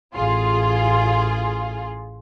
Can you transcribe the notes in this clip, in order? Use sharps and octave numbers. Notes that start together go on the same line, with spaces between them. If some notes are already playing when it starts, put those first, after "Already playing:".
A1 F4 G#4